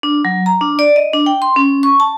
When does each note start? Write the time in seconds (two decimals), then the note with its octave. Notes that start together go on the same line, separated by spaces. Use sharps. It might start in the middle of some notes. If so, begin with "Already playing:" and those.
0.03 D4
0.25 F#3
0.46 A#5
0.61 D4
0.79 D5
0.96 D#5
1.13 D4
1.26 G5
1.42 C6
1.56 C#4
1.83 C#6
2.00 A5